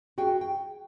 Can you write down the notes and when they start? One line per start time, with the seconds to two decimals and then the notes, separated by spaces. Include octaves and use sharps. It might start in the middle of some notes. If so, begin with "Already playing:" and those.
0.18 F#4 G#4 G5
0.41 G5